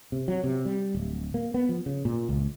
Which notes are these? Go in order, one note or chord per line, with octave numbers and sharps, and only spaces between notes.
C3
F#3
C3
G3
D1
A#3
B3
F3
C#3
A#2
C#2